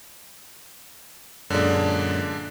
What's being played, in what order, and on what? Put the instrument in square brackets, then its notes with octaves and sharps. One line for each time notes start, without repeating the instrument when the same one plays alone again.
[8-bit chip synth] F#2 A#2 [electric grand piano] D3 G#3 D4